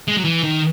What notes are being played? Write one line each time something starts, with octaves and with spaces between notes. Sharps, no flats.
G#3
F#3
E3
D#3